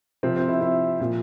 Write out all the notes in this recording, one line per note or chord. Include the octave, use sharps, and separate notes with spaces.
C3 F3 C4
C4
E4
E4
A#2 F3